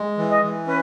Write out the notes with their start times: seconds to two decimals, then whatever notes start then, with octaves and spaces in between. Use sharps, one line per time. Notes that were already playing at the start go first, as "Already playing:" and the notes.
Already playing: G#3
0.18 E3
0.29 D#5
0.43 E3
0.67 C#4 B4